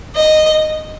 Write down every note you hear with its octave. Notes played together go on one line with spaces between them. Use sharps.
D#5